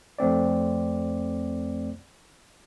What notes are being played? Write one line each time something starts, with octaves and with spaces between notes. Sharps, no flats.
F2 A3 C4 D5